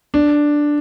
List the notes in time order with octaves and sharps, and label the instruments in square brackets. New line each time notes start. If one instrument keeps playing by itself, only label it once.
[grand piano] D4